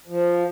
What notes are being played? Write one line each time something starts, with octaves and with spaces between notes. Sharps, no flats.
F3